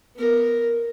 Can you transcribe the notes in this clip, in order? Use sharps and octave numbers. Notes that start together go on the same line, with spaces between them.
B3 A#4